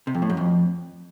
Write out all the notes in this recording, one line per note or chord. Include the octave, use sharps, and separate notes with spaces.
C3
F2
A2
F#2
F2